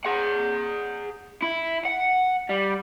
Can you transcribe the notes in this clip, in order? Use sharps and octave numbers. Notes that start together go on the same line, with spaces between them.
G#4 F#5
E4
F#5
G3